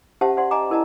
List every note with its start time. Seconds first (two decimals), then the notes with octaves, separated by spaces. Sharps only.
0.21 C#4 G4 C5 E5 F#5 A5
0.37 C5 D5 F#5 C6
0.51 D#5 G#5 A#5 D6
0.70 E4 A#4 D5 D#5 A5 A#5